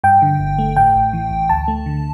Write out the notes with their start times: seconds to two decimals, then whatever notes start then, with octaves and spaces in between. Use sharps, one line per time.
0.04 G2 G5
0.22 D3
0.40 G1
0.58 A3
0.77 A2 G5
0.95 A1
1.13 E3
1.31 A1
1.50 D2 A5
1.68 A3
1.86 D3